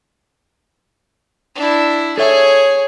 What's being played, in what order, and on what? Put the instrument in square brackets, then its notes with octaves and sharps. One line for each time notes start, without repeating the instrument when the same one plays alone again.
[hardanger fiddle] D4 E4
[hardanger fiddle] G#4 [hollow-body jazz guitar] A4 E5 [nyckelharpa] C#5